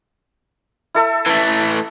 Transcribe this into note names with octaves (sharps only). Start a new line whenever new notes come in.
E4 A4 E5
E3 A3